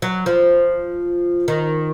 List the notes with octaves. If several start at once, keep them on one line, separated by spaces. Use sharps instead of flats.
F#3
F3
D#3